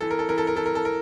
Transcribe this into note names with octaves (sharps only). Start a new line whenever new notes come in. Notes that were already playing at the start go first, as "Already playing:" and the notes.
E3 A4
A#4
A4
E3 A#4
A4
A#4
E3 A4
A#4
A4
A#4